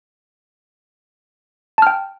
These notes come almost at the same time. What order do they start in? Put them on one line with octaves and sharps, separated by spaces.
A5 F6 G5